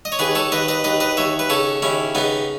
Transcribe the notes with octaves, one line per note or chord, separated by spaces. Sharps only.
D#5
C#5
D#2 G#4 B4
A4 C#5
D#2 B4 D#5
B4 D#5
D#2 B4 D#5
B4 D#5
D#2 C#5 E5
B4
C#3 A4 C#5
D#2 C#4 E4
C#3 B3 D#4